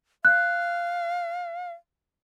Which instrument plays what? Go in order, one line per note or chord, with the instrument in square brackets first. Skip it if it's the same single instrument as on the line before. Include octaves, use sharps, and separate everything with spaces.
[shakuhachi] F5 [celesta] F#6